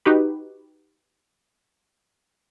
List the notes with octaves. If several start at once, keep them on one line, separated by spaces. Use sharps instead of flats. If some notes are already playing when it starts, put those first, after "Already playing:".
D#4 F#4 G4 B4